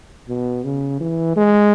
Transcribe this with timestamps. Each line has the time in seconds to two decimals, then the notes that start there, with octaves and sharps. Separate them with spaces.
0.29 B2
0.64 C#3
1.00 E3
1.36 G#3